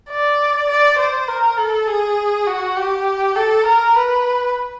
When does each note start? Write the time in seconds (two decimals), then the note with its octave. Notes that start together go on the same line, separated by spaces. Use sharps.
0.10 D5
0.69 D5
0.98 C5
1.28 A#4
1.58 A4
1.87 G#4
2.47 F#4
2.77 G4
3.35 A4
3.66 A#4
3.95 B4